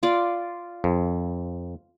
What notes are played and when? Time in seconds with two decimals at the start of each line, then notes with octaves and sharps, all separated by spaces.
0.03 F4 D5
0.84 F2